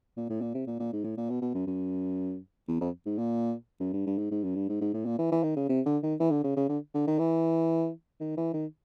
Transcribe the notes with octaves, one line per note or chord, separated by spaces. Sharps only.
A#2
A2
A#2
C3
A#2
A#2
G#2
A2
A#2
B2
B2
F#2
F#2
E2
F2
G#2
A#2
F#2
G2
G2
G#2
G#2
F#2
G2
G#2
G#2
A2
A#2
E3
E3
D#3
C#3
C3
D3
D#3
E3
D3
C#3
C#3
D3
D3
D#3
E3
D#3
E3
D#3